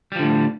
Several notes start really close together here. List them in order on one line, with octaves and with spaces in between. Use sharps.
G3 F3 D3 A2